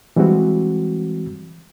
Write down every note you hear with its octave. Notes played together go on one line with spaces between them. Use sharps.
E3 G3 G#3 C4 F#4